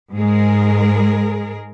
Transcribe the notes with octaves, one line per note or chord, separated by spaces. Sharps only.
G#2 G#3 G#4 A#4